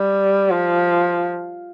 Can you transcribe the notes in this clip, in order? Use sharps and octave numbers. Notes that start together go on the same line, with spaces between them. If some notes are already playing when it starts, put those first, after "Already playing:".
Already playing: G3
F3